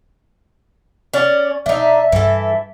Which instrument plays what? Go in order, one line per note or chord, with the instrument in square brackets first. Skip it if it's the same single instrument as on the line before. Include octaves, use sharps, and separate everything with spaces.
[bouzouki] C#4 [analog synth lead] D5
[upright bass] B2 [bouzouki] D4 D#4 [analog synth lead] E5
[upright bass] G2 [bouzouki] E3 A4